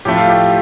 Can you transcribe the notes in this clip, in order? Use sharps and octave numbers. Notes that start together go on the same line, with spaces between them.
A2 F3 A3 G4
F4
G4